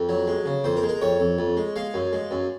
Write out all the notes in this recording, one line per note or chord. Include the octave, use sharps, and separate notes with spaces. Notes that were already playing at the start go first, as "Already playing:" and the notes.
Already playing: F2
F#3
G#3
C#3
F2 C5
A#4
G#3
A#4
F2 C#5
F2
F2
G#3
G#3 F5
F#2
G#3
F#2